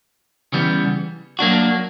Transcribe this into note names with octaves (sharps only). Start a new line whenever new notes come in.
C#3 E3 G3 B3
F#3 A#3 D4 F#4